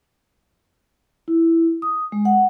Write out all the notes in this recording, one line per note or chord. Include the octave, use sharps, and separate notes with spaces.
E4
D#6
G#3
F#5